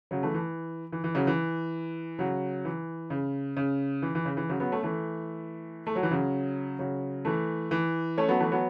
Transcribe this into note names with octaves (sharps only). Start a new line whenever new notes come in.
C#3 F#3
E3 A3
E3
E3
E3
C#3 F#3
E3
C#3 F#3
E3
C#3
C#3
E3
E3
C#3
E3
C#3 F#3
F#3 B3
A3 C#4
E3 A3
A3
F#3
E3
C#3 F#3
C#3 F#3
E3 A3
E3
A3 C#4
F#3 B3
E3 A3
F#3 B3